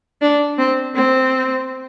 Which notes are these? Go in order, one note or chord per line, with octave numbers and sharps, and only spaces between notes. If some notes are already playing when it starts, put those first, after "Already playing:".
D4
C4
C4